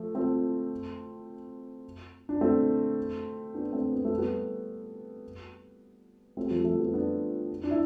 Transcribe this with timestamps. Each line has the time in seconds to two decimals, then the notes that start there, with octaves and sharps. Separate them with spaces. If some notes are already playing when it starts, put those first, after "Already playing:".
Already playing: F3 A3
0.15 A3 C4
2.29 D4
2.41 A3 C4
3.54 B3 D4
3.73 A3 C4
3.92 B3
4.05 A3
4.18 G3 B3
6.37 A3 C4
6.47 G3
6.51 F3 A3
6.60 G3
6.65 F3 A3
6.79 G3 B3
6.93 B3 D4
7.64 D4
7.71 E4